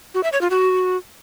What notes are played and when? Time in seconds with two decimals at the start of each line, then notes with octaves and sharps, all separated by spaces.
0.14 F#4
0.23 E5
0.32 C#5
0.41 F4
0.50 F#4